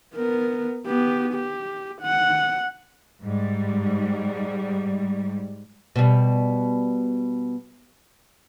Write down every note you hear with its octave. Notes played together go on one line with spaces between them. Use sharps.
B3 A#4
B3 G4
G4
F#5
G#2 G3
B2 G3